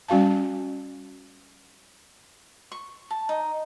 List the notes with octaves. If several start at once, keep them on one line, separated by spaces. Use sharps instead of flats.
G3 C#4 F#4 F5 A5
C#6
A5
D#4